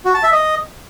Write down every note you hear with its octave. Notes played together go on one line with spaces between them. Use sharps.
F#4
A5
E5
D#5